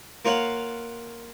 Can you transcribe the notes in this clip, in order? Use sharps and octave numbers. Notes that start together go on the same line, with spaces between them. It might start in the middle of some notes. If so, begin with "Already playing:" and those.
A#3 F4 C#5 F5 F#5